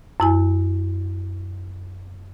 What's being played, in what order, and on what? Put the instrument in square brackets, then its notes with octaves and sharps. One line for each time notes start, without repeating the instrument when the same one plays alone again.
[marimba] F#2 E4 G#5